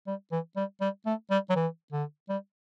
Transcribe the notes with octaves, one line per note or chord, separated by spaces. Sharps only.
G3
E3
G3
G3
A3
G3
F#3
E3
D3
G3